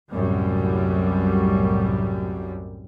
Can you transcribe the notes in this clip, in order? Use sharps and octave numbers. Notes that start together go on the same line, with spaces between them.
C2 F#2 A2 G3